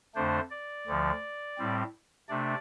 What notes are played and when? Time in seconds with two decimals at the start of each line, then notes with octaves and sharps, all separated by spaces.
0.15 F2 D3 A3 D4 C5
0.51 D5
0.87 D2 D3 F3
1.58 A2 G3 C4
2.29 C3 A3 D4 D5